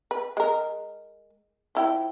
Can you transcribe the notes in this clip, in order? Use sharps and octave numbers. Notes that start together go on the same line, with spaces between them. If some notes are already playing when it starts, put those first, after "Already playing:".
B4
G#3 A#4
F3 E4 G5